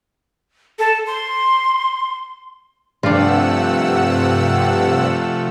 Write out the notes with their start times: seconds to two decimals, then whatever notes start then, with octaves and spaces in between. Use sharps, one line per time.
0.79 A4
1.07 C6
3.03 G2 C3 F3 A3 D4 F4 F#5 E6